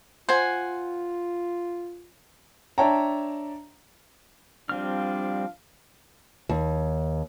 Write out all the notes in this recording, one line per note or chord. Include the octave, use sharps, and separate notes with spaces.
F4 C5 F#5 G#5
D4 C#5 E5 G5 A5 A#5
F3 G3 C4 D4 F5 F6
D#2